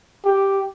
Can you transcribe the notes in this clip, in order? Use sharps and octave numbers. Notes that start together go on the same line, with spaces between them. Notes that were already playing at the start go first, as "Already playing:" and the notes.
G4